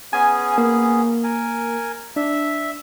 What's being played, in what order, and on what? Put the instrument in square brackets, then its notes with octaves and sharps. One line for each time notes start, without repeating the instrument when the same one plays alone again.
[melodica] B3 C#4 G#4 [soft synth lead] G#5
[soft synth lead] A#3
[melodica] A#4 G#5
[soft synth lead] D4 [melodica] E5